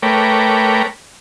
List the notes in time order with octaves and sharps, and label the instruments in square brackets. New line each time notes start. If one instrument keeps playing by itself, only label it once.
[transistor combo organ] A3 A#4 B4 C#5 G5 D6